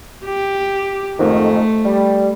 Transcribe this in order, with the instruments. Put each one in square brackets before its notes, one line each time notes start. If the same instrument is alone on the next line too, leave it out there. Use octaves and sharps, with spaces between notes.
[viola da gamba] G4
[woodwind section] F2 G#2 D#3 [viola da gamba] A3
[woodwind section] G3